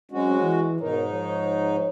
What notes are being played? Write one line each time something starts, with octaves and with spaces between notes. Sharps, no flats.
F#3 G#3 C4 C#4 F#4
E3
G#2 B2 D#4 A#4 C#5
F3 C#5